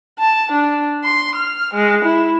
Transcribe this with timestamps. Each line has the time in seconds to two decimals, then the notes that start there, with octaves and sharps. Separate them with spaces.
0.19 A5
0.52 D4
1.04 C6
1.35 F6
1.74 G#3
2.05 E4